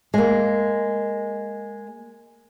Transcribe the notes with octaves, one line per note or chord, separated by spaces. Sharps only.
G#3 A#3